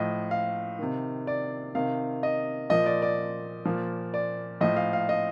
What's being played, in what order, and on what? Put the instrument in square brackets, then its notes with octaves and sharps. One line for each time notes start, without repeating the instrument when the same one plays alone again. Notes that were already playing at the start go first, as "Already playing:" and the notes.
Already playing: [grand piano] A2 F3 D#5
F5
C3 D#3
D5
C3 D#3 F5
D#5
A#2 F3 D#5
D5
D5
A#2 F3
D5
A2 F3 D#5
F5
F5
D#5